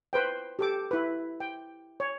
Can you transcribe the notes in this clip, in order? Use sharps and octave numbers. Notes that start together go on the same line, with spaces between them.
B4 C5 G5
G4 A4 D6
E4 B4
G5
C#5